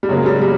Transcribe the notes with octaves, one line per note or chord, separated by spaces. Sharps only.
G3
F#2 C#3 F#3 G#3 A#3
G3
G3